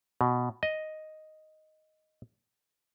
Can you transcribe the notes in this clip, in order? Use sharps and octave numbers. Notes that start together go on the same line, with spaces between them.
B2
D#5